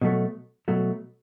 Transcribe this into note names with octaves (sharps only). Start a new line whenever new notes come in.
B2 F#3 A3
B2 F#3 A3